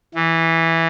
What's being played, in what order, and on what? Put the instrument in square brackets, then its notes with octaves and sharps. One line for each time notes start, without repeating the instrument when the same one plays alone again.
[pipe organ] E3